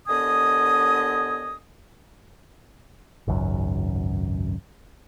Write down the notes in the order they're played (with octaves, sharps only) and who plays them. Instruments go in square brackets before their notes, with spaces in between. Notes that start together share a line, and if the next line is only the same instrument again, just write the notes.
[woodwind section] D#2 D3 B3 D#5 G#5 D#6
[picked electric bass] G#1 C#2 F#2